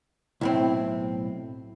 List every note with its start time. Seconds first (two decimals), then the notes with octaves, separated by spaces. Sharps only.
0.41 B1 A2 C4 E4